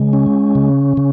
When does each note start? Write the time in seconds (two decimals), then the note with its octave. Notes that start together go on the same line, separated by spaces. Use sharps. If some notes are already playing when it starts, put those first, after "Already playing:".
Already playing: C#3 G#3
0.13 C#4
0.55 C#3
0.97 C#3